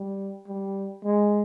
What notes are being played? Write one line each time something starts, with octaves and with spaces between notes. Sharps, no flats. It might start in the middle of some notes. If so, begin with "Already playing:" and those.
Already playing: G3
G3
G#3